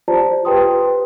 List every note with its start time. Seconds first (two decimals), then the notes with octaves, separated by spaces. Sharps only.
0.08 F4 G4 C5 D5 A5 A#5
0.45 G4 B4 G5 C6 D#6